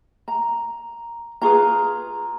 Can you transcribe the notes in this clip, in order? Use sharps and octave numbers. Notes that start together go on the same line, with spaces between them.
A#5
F4 G#4 B4 A#5